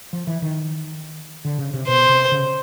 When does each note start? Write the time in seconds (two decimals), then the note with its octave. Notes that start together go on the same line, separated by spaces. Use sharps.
0.13 F3
0.27 E3
0.42 D#3
1.45 D3
1.59 C#3
1.74 C3
1.88 B2 C5
2.09 C3
2.32 C#3